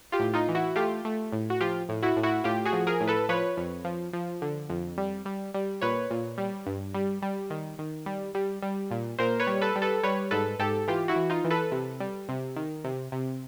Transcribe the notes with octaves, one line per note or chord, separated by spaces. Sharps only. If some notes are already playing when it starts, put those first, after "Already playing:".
F4 G4
A2
D#4 F4
E3
E4 F#4
A3 F4 G4
A3
A2
F#4
F3 F4 G4
A2
E4 F#4
A2
E4 F#4
A2 F4 G4
F#4 G#4
F3
G#4 A#4
A2
A4 B4
F3 B4 C#5
F2
F3
F3
D3
F2
G3
G3
G3
A#2 B4 C#5
A#2
G3
G2
G3
G3
D#3
D#3
G3
G3
G3
A#2
A#2 A#4 C5
B4 C#5
G3
A4 B4
G3
A4 B4
G3 B4 C#5
G#2 A4 B4
G#2 G4 A4
E3 F4 G4
E4 F#4
E3
D#4 F4
E3
A4 B4
C3
G3
C3
D#3
C3
C3